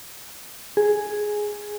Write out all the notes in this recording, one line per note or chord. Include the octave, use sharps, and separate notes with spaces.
G#4